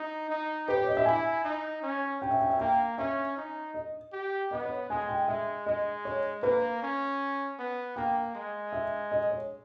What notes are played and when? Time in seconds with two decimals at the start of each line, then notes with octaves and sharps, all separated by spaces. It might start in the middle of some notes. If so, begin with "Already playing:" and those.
Already playing: D#4
0.30 D#4
0.68 G4 B4
0.77 C#5
0.87 D#5
0.97 E5
1.05 E4 G#5
1.44 D#4
1.83 C#4
2.21 C#4 G5
2.31 E5
2.40 G5
2.50 E5
2.59 A#3 G5
2.98 C#4 E5
3.37 D#4
3.74 D#5
4.12 G4
4.51 B3 D#5
4.65 C#5
4.90 G#3 G#5
5.09 G5
5.28 G#3 E5
5.66 G#3 D#5
6.05 C#5
6.42 A#3 B4
6.82 C#4
7.59 B3
7.96 A#3 G5
8.35 G#3
8.73 E5
9.12 D#5
9.31 C#5